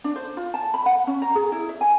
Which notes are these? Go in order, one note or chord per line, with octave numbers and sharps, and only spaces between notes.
D4
C5
F4
A5
B5
F#5
C#4
A#5
G#4
E4
E5
G#5